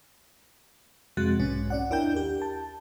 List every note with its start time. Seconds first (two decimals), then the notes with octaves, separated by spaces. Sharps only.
1.17 F2 C3 G#3 F#4 F#6 A6
1.40 B1 G#2 C#4
1.70 C#4 D5 F#5
1.90 D#2 D4 E4 A#4 G5 G6
2.16 G4
2.42 A5